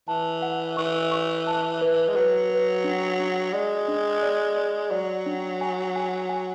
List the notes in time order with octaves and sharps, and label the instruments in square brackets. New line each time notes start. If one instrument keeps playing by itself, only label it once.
[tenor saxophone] E3 [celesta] A5
[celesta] F#5
[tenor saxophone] E3 [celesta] C#6
[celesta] C#6
A5
B4
[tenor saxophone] G#3
[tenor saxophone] F#3 [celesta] B4
[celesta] B4
D4
D4
[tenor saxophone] G#3 [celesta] D5
[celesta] D4
D5
D5
[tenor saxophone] F#3 [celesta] D5
[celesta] D4
G#5
G#5
G#5